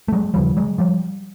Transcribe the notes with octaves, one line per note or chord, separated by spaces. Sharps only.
A3
F#3 G#3
D#2 C#3 F3 G3
F#3 G#3
F3 G3